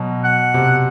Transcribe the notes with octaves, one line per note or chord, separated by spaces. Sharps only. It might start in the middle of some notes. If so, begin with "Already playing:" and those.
Already playing: B2 F#3
F#5
C3